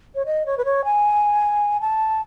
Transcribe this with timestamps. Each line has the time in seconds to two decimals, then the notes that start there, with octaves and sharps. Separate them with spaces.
0.15 C#5
0.26 D#5
0.46 C#5
0.58 B4
0.65 C#5
0.85 G#5
1.81 A5